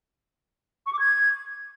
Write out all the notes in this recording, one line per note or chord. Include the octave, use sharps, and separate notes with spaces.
C#6
D6
G#6